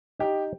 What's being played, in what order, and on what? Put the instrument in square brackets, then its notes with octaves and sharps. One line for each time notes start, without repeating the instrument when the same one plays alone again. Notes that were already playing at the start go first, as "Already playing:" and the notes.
[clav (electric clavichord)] D#4 [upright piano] G4